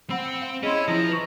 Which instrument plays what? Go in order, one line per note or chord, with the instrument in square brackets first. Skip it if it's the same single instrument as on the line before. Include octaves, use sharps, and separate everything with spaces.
[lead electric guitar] C4 [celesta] F#5 B5 E6
[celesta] C#7
F5
[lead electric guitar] C#4 [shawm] E4 [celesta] G#4 C6 [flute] D#5
[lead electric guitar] F3 [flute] E4 [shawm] A#5 [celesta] D#6
[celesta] B4 C#6